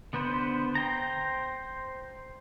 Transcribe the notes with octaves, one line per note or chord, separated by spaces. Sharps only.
D3 B3 B4 C5
C5 G5 A#5